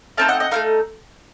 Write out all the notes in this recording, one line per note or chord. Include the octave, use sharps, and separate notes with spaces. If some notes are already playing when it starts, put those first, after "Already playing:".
A3 C4 D#4 F5 A5
D#5 F#5
D#5 F#5
A3 C4 D#4 F5